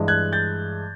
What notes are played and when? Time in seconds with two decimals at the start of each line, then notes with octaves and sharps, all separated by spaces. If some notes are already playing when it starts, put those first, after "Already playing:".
Already playing: G2 E3 G#3
0.08 F#6 G#6
0.32 G6 A6